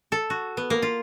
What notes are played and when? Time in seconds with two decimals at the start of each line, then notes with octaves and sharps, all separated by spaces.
0.12 A4
0.30 F#4
0.57 B3
0.70 A#3
0.82 F4